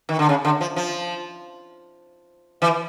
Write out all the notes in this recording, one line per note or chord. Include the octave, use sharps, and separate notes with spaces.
D#3
D3
C#3
D3
F3
F3
E3